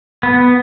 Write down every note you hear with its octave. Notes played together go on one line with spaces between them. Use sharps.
B3